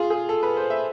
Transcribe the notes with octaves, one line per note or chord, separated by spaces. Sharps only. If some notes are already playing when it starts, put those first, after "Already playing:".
Already playing: F4 G#4
G#4
A4
B4
C5
E5